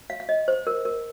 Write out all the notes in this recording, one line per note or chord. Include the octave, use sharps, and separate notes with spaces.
F5
F5
D#5
C5
A#4
A#4